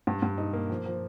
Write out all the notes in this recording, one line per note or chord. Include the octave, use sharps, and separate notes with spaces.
G2
G2
D#4
A#3
F3
F3